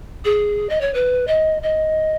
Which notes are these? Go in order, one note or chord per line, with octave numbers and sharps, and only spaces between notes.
G#4
D#5
C#5
B4
D#5
D#5